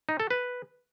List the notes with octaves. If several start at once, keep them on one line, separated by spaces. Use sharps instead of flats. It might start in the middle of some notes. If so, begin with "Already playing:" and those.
D#4
A4
B4